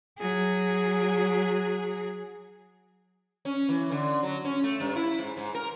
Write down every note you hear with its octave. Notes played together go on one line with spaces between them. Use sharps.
F#3 G#4
C#4
E3
D3
F#3
C#4
A3
G2
E4
G#2
G#2
A#4